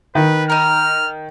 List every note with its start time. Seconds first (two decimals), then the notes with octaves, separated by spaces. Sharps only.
0.15 D#3 B4
0.50 D#4 A#4 F6